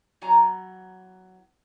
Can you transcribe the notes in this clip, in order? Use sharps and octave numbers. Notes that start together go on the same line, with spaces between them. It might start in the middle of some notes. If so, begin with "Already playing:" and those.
E3 F#3 B3 G#5 A#5